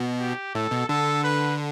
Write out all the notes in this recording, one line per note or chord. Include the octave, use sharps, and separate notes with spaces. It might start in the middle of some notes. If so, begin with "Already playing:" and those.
Already playing: B2
G4
A2 A4
B2
D3 A4
B4